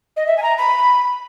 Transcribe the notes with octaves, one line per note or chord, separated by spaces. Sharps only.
D#5
E5
G#5
A#5
B5